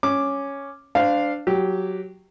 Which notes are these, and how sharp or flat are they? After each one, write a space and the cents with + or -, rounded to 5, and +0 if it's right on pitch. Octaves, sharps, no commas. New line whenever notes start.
C#4 +0 D6 +0
D4 +0 C5 -30 F5 +0
F#3 +0 G4 -10